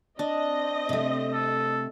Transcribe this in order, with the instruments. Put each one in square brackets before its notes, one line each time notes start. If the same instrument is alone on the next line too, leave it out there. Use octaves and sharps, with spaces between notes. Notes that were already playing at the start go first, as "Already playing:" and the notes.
[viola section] C4 D#5 [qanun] D4
[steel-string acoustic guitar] C3 A3
[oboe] A4